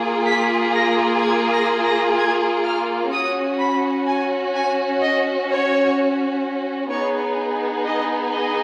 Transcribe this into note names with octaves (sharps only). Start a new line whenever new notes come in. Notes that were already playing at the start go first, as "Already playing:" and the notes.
Already playing: A#3 F4 G#4
B6
A#6
G#6
A#6
A#6
G#6
F6
C#4 F#4 D#6
B5
G#5
G#5
D#5
C#5
B3 D#4 G#4 C#5
D#5
D#5